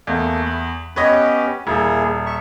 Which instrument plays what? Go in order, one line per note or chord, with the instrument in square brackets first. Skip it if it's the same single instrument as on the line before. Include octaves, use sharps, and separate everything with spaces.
[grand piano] E2 [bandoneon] A3 A#3
[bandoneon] B5
[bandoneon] B3 C#4 G4 [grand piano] B4 C#5 D#5
[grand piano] D#1 [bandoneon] A#3 E4 G#4
[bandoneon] E5 C#6